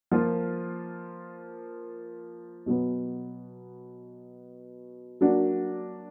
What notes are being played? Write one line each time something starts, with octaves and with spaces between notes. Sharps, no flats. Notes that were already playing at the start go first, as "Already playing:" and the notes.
F3 A#3 F4
B2 F#3 B3
F#3 A#3 D4 F#4